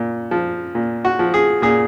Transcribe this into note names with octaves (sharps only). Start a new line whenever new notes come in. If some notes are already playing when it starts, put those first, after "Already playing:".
Already playing: A#2
F3
A#2
F#4
F3
G#4
A#2 G#4